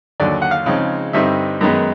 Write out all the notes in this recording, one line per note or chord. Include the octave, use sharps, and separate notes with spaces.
D#2 D3 F#3 D5
F#5
F5
C#3 F3 G#3 C4 D#4
G2 D3 G3 C4 D#4 E5
F#2 D#3 G#3 B3 D#4